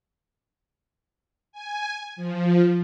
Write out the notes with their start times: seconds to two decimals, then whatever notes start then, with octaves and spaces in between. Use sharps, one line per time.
1.52 G#5
2.16 F3